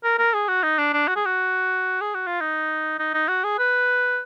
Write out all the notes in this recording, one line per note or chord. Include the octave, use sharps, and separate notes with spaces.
A#4
A#4
G#4
F#4
D#4
D4
D4
F#4
G#4
F#4
G#4
F#4
F4
D#4
D#4
D#4
F#4
G#4
B4